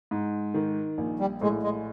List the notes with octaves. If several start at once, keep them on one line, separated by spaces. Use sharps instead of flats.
G#2
D#3
A#1
G3
A2 G#3
G#3